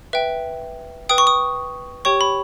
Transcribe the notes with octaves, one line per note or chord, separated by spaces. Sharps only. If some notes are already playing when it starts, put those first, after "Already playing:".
B4 E5 G5
B4 G5 D#6
C#6
D#6
G4 C#5 G5 C#6
B5